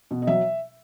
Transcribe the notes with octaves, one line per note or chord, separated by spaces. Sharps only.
B2
D#5
F#3 E5